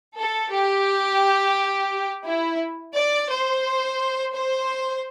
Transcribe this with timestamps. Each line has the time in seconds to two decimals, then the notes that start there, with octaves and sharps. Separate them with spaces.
0.16 A4
0.51 G4
2.25 E4
2.95 D5
3.30 C5
4.35 C5